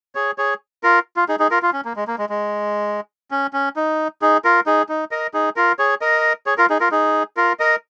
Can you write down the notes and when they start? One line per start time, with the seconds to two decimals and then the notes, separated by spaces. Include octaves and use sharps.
0.15 G#4 C#5
0.38 G#4 C#5
0.83 F4 A#4
1.16 F4
1.29 D#4 G#4
1.39 D#4 G#4
1.51 F4 A#4
1.63 F4
1.73 C#4
1.85 A#3
1.96 G#3
2.08 A#3
2.18 G#3
2.29 G#3
3.31 C#4
3.53 C#4
3.76 D#4
4.22 D#4 G#4
4.45 F4 A#4
4.66 D#4 G#4
4.89 D#4
5.11 A#4 D#5
5.34 D#4 G#4
5.56 F4 A#4
5.79 G#4 C#5
6.01 A#4 D#5
6.46 G#4 C#5
6.58 F4 A#4
6.70 D#4 G#4
6.80 F4 A#4
6.91 D#4 G#4
7.37 F4 A#4
7.59 A#4 D#5